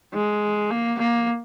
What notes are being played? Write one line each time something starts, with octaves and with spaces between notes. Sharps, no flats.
G#3
A#3
A#3